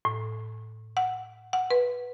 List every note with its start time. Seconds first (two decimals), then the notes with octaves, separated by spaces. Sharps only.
0.05 A2
0.97 F#5
1.53 F#5
1.71 B4